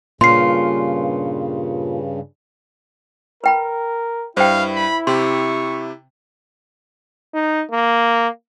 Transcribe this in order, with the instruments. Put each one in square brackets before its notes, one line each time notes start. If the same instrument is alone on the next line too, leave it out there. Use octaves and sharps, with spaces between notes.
[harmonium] G2 C#3 [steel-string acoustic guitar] A#2 C#4 F4 [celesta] C6 C7
[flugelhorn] A#4 [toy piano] B4 G5 B5
[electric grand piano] G2 [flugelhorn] E4 [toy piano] C5 G5 [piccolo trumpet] F5
[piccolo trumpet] B5
[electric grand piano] C3 G4 [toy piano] C6 [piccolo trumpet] C#6
[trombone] D#4
A#3